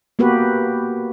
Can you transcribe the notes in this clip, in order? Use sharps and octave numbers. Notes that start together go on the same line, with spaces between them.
A#3 B3 F#4 G4 B4